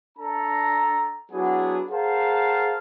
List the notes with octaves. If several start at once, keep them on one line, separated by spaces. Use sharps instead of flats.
D4 A4 A5 A#5
F#3 B3 D4 E4 F#4 G#4
G#4 A#4 C5 F5 F#5 A5